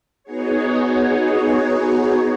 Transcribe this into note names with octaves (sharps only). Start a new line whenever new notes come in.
B3 D#4 F#4 G#4 C#5